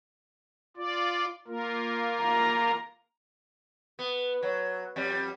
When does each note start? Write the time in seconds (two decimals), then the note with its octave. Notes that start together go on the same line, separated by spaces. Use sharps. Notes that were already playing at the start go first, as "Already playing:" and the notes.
0.77 F4 D5
1.47 A#3 F4 A#4
2.21 A#5
3.99 B3
4.43 F#3
4.96 F2 G3